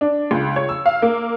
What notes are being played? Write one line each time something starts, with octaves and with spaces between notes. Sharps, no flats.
D4
C#2
C#5
E6
F5
A#3